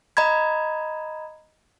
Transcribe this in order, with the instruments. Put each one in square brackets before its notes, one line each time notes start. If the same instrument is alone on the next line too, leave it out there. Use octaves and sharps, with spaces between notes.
[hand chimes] D#5 A#5 B5 G#6